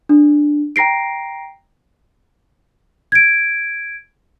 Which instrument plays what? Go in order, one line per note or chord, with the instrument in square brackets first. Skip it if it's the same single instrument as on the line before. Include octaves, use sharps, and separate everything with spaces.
[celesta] D4
G5 A#5 A#6 C7 D7
G#6 D7